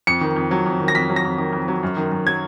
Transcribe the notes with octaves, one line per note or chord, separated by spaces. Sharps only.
F2 C#7
D#3
F2
F#3
F2
D#3
A#6
F2 B6
F#3
A#6
F2
D#3
F2
F#3
F#2
D#3
F#2
F#3 G#6